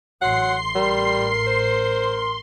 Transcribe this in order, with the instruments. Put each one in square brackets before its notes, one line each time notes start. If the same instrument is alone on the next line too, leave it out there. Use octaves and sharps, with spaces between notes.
[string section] A1 C7 [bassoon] F#3 [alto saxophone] F#5 [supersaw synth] C6
[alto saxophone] G3 [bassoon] A#4
[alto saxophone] C5